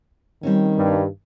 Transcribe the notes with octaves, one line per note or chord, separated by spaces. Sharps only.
D#3 G3 C4 C#4
G2